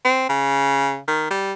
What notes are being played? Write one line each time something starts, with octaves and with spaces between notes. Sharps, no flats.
C4
C#3
D#3
G3